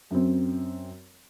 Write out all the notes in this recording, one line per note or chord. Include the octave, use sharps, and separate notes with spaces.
F#2 C4